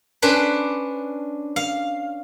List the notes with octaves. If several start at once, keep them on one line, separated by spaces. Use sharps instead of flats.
C#4 D4 B4 C5
F5